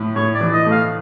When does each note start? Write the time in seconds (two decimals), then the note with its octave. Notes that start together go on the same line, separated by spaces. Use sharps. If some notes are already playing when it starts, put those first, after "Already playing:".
Already playing: A2 A3
0.16 A2 C#5
0.34 D5
0.41 E3
0.53 D#5
0.66 A3
0.72 F5